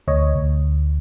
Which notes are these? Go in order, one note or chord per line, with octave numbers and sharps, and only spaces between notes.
D2 C#5 D#5
D2